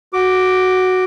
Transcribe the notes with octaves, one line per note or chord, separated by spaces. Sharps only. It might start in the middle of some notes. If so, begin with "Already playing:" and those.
F#4 D6